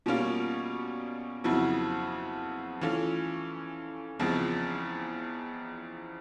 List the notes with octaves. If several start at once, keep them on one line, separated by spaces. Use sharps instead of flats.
B2 G3 A#3 C#4 F4
F2 C#3 F#3 B3 E4
E3 A3 C#4 F4
E2 C#3 F3 G#3 C4